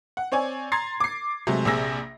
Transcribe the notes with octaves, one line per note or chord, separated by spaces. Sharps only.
F#5
C4 C#5 D5 G#5
A#5 C6 G#6 A6 C7
D6 C7
C3 F#3 G#3 A3
A#1 C3 G#4 E6 A#6